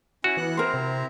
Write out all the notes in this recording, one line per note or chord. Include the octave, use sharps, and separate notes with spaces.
C#4 E4 F#4
E3 B3 F#5 F#6
C4 E4 A#4 C5 A#5
C3